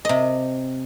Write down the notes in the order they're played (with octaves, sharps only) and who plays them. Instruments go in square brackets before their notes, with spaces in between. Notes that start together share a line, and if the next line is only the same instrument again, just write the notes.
[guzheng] C3 D#5